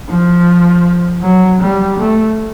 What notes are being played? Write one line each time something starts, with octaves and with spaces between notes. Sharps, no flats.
F3
F#3
G3
A3